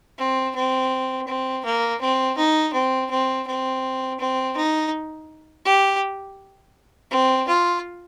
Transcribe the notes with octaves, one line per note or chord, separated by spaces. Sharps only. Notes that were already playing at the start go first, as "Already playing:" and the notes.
C4
C4
C4
A#3
C4
D#4
C4
C4
C4
C4
D#4
G4
C4
F4